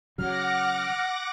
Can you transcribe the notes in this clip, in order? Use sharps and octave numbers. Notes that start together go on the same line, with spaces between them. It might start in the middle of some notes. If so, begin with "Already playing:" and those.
C#3 F#3 F#5 D6 F6 A#6